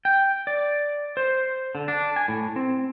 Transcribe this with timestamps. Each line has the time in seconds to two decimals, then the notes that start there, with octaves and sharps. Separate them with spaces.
0.05 G5
0.47 D5
1.17 C5
1.75 D3
1.88 D4
2.16 G#5
2.28 A2
2.56 C4